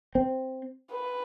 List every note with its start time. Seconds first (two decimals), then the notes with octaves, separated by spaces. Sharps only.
0.15 C4
0.92 B4